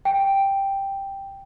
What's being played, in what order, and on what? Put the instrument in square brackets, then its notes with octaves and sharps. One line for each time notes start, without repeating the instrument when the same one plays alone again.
[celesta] G5